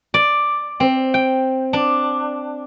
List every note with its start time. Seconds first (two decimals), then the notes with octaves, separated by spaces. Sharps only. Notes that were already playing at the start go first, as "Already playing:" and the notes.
0.14 D5
0.80 C4
1.14 G5
1.73 D4